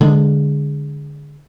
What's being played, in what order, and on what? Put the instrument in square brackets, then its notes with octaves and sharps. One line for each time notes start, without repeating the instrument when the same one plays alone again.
[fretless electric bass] D3 G#3